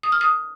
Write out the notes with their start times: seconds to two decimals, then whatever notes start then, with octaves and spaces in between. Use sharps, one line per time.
0.03 D#6
0.12 F6
0.21 D#6